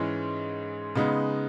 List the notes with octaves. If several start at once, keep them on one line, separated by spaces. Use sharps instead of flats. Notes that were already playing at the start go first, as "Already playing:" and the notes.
Already playing: G#2 E3 G#3 C#4
C#3 G#3 B3 D#4